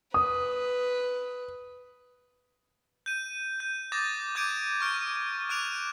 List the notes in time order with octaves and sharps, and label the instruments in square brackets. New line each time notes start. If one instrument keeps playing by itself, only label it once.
[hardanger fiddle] B4 [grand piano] D#6
[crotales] G6 D#7
G6
D6 D#6 G6 A6 A#6
D6 G6 G#6 D7 D#7
C#6 F6 D7
D6 F#6 D7 F7